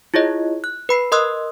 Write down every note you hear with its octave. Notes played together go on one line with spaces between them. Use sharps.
E4 F4 G#4 C#5 D#5
F#6
B4 B5 C7
A#4 D#5 C6 D#6 E6 F#6